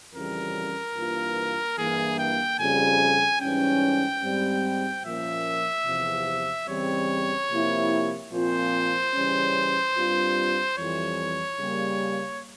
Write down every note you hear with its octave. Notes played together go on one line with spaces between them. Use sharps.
F2 C#3 E3 G3 C#4 A#4
G2 E3 A#3 F4
G2 E3 A#3 G#4
G5
F2 C#3 G3 G#5
G#2 E3 G3 C#4 G5
G#2 G3 C4
A#2 F3 A#3 C#4 E5
E2 C3 F3
E2 C#3 E3 G3 C4 C#5
C3 F3 A#3 E4 G4
A#2 F3 C4 F4 C5
C#3 E3 G3 C#4
G2 G3 C4 F4
F2 E3 G3 C#5
C#3 G3 A#3